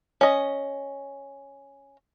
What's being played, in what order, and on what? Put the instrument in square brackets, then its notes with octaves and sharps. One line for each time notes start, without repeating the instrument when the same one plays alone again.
[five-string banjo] C#4 D#5